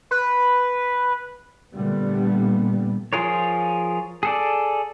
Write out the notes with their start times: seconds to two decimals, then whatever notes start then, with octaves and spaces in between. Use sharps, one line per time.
0.11 B4
1.74 A#2 D3 G3 A3 B3
3.13 F3 F4 G#4 A#4 C#5
4.23 G#4 A4 D5